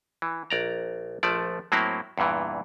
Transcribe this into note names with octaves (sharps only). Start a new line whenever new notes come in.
E3
A#1 D5 A#5
A#1 F3 A3 D5
A2 F#3 A#3 C4 E4
E2 G2 A#2 E3